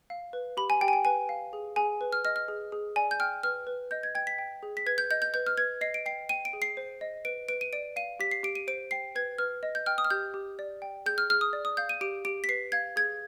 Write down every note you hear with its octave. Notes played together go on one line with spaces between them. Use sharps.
F5
B4
G4 B5
G#5
G4 G5
G#5
G5
B4 G#5
F5
G#4
G#4 G#5
B4
F6
D#5 F6
F6
G#4
G#4
D5 G#5
G6
G5 F6
B4 F6
B4
D#5 G6
G#6
G5 G#6
B6
G5
G#4
B6
B4 G#6
G6
D#5 G6
G6
B4 G6
F6
B4 G#6
D#5 C7
D7
G5 C7
G5 D#7
D7
G#4
C7
C5
D#5
B4 D7
B4 D7
D#7
D5 D7
F5 D#7
G4 B6
C7
G4 D7
D#7
C5 D7
G5 C7
B4 G#6
B4 F6
D#5
G6
G5 F6
D#6
F6
G4 G6
G4
D5
G5
G#4 G6
F6
G#4 F6
D#6
D5
D#6
F5 G6
D#7
G4 D7
G4 D7
B6
B4 C7
F5 G#6
G#4 G#6